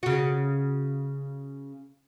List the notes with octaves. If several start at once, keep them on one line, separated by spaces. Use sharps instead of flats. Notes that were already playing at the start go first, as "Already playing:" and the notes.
C#3 F#4